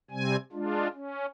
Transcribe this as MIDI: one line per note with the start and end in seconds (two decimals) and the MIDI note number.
0.11 0.36 48
0.11 0.36 55
0.11 0.36 60
0.11 0.36 80
0.52 0.88 56
0.52 0.88 62
0.52 0.88 65
0.93 1.26 61